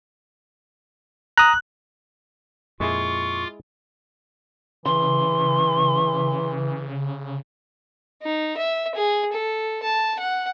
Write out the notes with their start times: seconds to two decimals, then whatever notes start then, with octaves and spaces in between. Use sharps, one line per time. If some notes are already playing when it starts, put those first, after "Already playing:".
1.38 A#5 D#6 F#6
2.80 F2 A#2 G#3 E4 F4 G#4 C#6 D6
4.86 C#3 E3 C6
8.22 D#4
8.57 E5
8.95 G#4
9.33 A4
9.83 A5
10.19 F#5